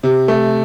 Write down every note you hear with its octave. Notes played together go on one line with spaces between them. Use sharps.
C3
A3